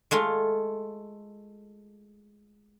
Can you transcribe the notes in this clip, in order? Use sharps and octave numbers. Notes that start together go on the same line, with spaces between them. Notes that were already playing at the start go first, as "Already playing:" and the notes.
G#3 A3 F4